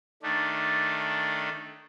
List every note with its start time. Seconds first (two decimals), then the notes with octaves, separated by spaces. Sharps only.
0.23 D#3 A3 D4